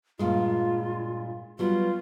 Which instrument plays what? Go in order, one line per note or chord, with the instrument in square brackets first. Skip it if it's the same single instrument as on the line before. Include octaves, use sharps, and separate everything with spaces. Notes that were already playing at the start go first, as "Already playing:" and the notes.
[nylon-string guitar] G2 A#2 G#3 [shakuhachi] F4
[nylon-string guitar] F#3 G3 B3 [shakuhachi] F4